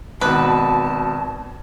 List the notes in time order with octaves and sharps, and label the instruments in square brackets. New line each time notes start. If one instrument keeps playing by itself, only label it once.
[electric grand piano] G#1 B2 [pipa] B4 [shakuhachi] A5